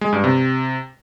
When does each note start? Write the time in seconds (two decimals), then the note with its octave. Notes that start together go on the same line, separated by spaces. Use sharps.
0.01 G#3
0.13 G2
0.24 C3